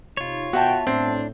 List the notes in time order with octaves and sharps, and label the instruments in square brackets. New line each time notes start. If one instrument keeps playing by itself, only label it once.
[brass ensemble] C3 D#4 [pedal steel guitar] F4 C#5
[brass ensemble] B2 D#3 G5 [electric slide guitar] B3 E5 A5 [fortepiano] F#4
[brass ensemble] A2 [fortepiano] C4 [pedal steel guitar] D4